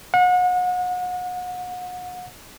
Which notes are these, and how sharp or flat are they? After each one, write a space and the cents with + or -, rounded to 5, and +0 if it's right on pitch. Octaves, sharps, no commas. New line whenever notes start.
F#5 -35